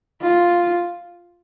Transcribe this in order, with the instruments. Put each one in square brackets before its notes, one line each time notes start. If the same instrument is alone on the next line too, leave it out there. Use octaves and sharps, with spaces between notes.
[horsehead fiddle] F4